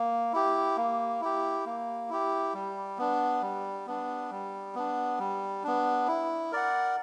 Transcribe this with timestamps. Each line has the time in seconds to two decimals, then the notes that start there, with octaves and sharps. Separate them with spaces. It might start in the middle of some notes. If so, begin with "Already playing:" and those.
Already playing: A#3
0.33 E4 G4
0.77 A#3
1.21 E4 G4
1.66 A#3
2.10 E4 G4
2.54 G3
2.98 B3 D4
3.42 G3
3.86 B3 D4
4.31 G3
4.75 B3 D4
5.19 G3
5.64 B3 D4
6.08 E4
6.52 A#4 D5 F#5